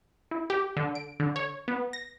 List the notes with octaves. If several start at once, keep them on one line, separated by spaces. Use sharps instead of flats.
E4
G4
D3
D7
D3
C#5
B3
A#6